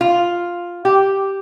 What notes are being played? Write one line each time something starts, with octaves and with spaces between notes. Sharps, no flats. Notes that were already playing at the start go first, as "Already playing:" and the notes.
F4
G4